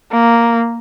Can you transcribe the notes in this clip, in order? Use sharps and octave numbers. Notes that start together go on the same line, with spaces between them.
A#3